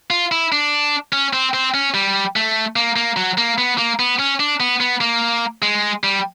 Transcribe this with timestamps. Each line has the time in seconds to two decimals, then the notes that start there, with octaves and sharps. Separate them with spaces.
0.10 F4
0.32 E4
0.52 D4
1.12 C#4
1.33 C4
1.54 C4
1.74 C#4
1.94 G3
2.36 A3
2.76 A#3
2.96 A#3
3.17 F#3
3.38 A#3
3.58 B3
3.78 A#3
3.99 B3
4.19 C#4
4.40 D4
4.60 B3
4.81 B3
5.01 A#3
5.62 G#3
6.04 G3